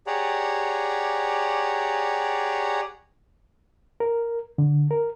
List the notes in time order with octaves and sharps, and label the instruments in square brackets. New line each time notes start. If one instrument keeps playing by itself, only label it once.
[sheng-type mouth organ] G4 G#4 C#5 D5 F#5 A#5
[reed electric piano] A#4
D3
A#4